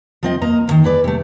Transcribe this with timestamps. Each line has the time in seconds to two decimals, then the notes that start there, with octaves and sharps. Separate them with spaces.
0.23 F3 C4 D#5
0.42 A#3 D#5 A#5
0.68 D#2 D#3
0.84 G#4 B4 D5
1.04 C3 A3